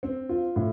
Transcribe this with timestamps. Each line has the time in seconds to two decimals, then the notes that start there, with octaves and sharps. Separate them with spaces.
0.03 C4
0.29 F4
0.56 A2